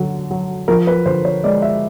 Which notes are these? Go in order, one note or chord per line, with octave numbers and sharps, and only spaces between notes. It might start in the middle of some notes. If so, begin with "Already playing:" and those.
Already playing: D3 F#3
F#3
F3 A#4
B4
D3 C5
C#5
G#3 D5
E5